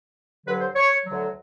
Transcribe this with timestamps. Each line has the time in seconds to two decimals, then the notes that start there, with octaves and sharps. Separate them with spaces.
0.45 G2 D3 F#3 B4
0.60 C5
0.75 C#5
1.06 D2 D3 F#3